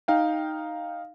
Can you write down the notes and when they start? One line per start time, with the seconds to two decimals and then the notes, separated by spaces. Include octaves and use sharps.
0.08 D#4 F5 G5